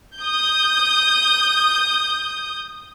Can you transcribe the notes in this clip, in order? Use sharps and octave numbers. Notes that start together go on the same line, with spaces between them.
D#6 G6